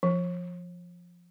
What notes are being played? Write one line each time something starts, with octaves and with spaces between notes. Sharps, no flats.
F3